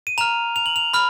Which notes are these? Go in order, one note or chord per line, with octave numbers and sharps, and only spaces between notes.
D#7
A#5 F6 F7
F7
F#7
F7
B5 F6